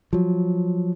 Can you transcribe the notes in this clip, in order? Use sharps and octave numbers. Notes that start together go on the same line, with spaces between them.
F3 F#3